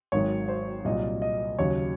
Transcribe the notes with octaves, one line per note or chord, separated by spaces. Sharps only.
G#1 G#2 D#3 F#3 C#5
C5
C2 A#2 F#3 D#5
D#5
D#2 C#3 F#3 C#5